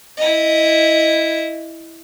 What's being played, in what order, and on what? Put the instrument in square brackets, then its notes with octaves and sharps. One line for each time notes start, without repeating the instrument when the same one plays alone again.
[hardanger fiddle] E4 D#5